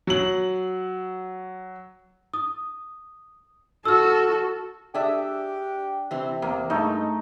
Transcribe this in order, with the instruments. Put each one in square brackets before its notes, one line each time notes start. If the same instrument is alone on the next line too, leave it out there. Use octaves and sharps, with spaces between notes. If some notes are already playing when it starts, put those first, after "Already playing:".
[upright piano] F#3 F#7
[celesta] D#6
[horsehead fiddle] F#4 A4 [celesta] E6 F6
[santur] D4 [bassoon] G4 [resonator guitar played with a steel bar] G#4 E5
[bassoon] C3 [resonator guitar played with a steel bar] E3 C4
[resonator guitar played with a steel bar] E2 [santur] A#3
[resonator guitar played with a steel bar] G2 [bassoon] G#3 [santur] A3 D#4